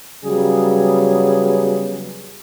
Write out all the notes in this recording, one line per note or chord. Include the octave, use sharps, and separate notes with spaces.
C#3 F#3 G3 B3 G#4